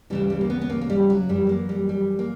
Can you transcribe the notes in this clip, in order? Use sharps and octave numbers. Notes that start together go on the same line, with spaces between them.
D2 C#3 E3 G3
G3
A#3
B3
B3
A#3
A#3
G3
F#3
F#2 E3 G3
A#3
G3
G3
A#3